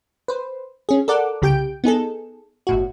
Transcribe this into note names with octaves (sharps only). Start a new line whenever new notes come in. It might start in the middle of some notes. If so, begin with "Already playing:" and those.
B4 C5
C#4 G#4
A4 A#4 D5 F#5 D6
C2 C#3 G4 G5 G6 D7
B3 D#4 G#4 A4
G1 A2 F#4